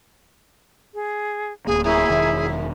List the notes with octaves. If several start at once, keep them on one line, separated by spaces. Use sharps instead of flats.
G#4
D1 E2 A#3 G#4
F#2 E4 G#4
E1 D#3